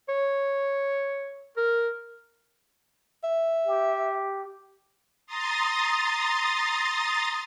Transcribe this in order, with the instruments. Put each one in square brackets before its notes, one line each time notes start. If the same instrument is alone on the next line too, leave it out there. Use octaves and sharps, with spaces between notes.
[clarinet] C#5
A#4
[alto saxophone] E5
[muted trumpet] G4
[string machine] A#5 C6 D#6 A6